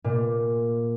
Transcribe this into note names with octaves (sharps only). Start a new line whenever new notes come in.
A#2